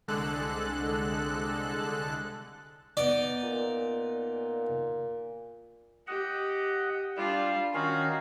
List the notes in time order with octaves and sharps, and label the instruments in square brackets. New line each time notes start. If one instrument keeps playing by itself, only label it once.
[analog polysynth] C2 D3 G#3 A4 F#6
[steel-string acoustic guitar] B3 D#4 [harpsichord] D5
[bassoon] A#2
[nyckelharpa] G4 [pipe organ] D#5 F#5
[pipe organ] G3 [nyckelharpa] D4 F4
[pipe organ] D#3 C#4 F5 [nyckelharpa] F#4